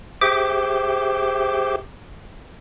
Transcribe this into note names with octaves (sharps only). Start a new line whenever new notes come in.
G4 G#4 C5 E5 G5 D6